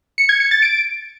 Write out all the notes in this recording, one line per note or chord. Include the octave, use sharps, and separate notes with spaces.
C#7
G#6
C#7
A6
D7